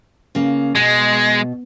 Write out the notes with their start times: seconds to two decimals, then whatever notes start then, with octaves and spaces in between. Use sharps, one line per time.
0.35 C#3 A#3
0.75 B2 G#3